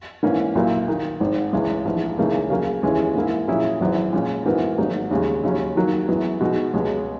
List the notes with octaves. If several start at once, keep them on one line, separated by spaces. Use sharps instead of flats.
G#2 E3 A#3 C#4
B1 A#2 F#3 A#3 E4
D#3 A#3 D#4
G#1 G#2 D#3
C#2 C#3 E3 G#3
A#1 G#2 E3
C#2 C#3 E3 A#3 D#4
C#3 F#3 A#3
D#2 C#3 E3 G#3 C#4
G#2 E3 A#3 E4
A#2 F#3 C#4 E4 G#4
G#1 F#2 E3
A#2 G#3 C#4
G#2 E3 B3 F#4 A#4
G#1 G#2 F#3 A#3 D#4
D#2 C#3 G#3
D#2 C#3 F#3 C#4
D#3 F#3 A#3
F#2 E3 G#3 B3 F#4
B2 G#3 D#4 F#4
C#2 B2 G#3